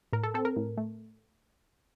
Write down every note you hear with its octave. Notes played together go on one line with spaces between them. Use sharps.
A2 A#4
A4
C4 A4
A#4
A2
A3